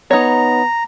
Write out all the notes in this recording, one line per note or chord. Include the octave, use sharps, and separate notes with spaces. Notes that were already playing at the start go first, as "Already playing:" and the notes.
B3 D#4 C#5 A#5